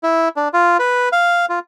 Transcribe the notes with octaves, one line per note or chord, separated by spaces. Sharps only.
E4
D4
F4
B4
F5
F4